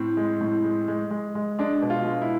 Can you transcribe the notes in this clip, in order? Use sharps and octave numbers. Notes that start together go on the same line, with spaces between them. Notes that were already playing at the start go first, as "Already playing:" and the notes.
Already playing: A2 C4
G#3
A2
G#3
G#3
G#3
G#3
G#3 D4
B2
F4
G#3
E4